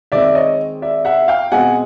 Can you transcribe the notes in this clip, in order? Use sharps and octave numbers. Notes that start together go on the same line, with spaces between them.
D#3 G#3 C4 D5 E5
C#5 D#5
D5 E5
E5 F#5
F5 G5
B2 G#3 C4 F#5 G#5